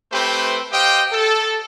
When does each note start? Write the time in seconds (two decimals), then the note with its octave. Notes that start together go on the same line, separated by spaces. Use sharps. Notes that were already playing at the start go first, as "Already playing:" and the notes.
0.12 A3 C4 G4 B4 C5 G5
0.72 G4 C5 D#5 F5 G5
1.13 A4